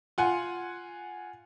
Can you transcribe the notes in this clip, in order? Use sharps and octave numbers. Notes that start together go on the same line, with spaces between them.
F4 F#5 G#5